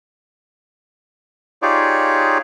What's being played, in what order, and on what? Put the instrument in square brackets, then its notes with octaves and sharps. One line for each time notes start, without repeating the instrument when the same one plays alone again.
[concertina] D#4 F4 G4 G#4 C#5 D5